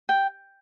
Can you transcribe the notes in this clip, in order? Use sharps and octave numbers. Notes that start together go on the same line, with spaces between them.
G5